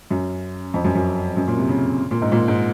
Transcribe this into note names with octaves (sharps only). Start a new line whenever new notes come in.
F#2
F2
F#2
F#2
F#2
A#2
C3
C#3
A#2
G#2
A#2
G#2